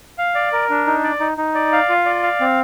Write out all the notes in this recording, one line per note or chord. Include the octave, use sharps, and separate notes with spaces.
F5
D5
A#4
D4
D#4
D5
D#4
D#4
D5
F5
F4
D5
F5
C4